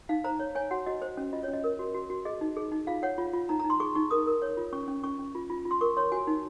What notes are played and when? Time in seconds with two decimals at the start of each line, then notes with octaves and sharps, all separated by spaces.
0.09 D#4 F5
0.24 C5 A#5
0.39 C#5
0.55 C#5 G#5
0.71 F#4 F#5
0.86 F#4 D#5
1.02 C5
1.17 C#4
1.33 F4 D#5
1.43 C#5
1.48 C#4
1.53 D#5
1.64 A#4
1.79 F#4
1.94 F#4
2.10 F#4
2.25 G#4 D#5
2.41 D#4
2.57 G#4
2.72 D#4
2.87 F4 F5
3.03 C#5 F#5
3.18 F4
3.34 F4
3.49 D#4 A#5
3.60 A#5
3.64 D#4
3.70 C6
3.80 G#4 C#6
3.95 D#4 C#6
4.11 A#4 D#6
4.27 A#4
4.42 C#5
4.57 F4
4.73 C#4 C#6
4.88 C#4
5.04 C#4 C#6
5.19 C#4
5.35 F4
5.50 F4
5.65 F4
5.71 C6
5.81 A#4 C#6
5.97 C#5 C6
6.12 F#4 G#5
6.27 D#4